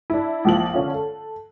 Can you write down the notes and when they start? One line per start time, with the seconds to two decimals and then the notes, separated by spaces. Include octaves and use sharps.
0.10 D4 E4
0.45 A#1 F3 F#7
0.74 D3 C#4 F4
0.94 A4